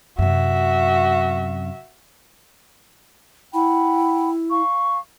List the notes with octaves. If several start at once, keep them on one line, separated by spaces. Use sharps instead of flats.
F#2 C3 F#4 E5
E4 F#5 G5 B5
F5 C#6